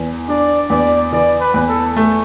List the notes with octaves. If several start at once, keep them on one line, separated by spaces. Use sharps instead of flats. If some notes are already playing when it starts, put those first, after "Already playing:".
Already playing: E2
D4 D5
E2 D5
E3 D5
B4
E2
A4
A3